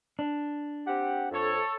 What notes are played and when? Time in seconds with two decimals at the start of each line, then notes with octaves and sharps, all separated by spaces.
0.19 D4
0.87 C4 G4 F#5
1.31 F2 A4 C#5